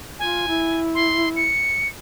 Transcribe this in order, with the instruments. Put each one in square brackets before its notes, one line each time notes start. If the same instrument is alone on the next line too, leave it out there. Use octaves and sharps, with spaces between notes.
[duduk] F4 [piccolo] G#5
[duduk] E4
[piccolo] C6
C#7